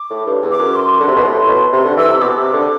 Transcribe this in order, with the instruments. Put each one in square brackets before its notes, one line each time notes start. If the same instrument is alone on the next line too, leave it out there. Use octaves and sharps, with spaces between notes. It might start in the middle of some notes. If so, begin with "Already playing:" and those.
Already playing: [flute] D6
[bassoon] A2
G2
E2
[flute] D6
[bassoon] F#2
[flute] C6
[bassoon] D3
C3
B2
A2
B2
[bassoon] C3 [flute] C6
[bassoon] D3
[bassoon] E3 [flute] E6
[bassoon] C3
[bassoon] B2 [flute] D6
[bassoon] C3
D3